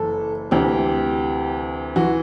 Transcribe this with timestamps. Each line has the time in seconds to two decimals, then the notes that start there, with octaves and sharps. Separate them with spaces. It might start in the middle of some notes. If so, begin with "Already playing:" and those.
Already playing: F#1 F#2 E3 A4
0.51 D2 C3 E3 G4
1.96 E3 F#4